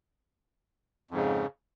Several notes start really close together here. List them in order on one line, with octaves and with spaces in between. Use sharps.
F2 G#2 C#3